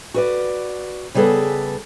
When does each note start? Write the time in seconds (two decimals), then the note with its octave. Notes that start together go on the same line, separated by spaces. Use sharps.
0.14 F#4 B4 D5
1.15 C#3 G3 B3 G#4 A4 B4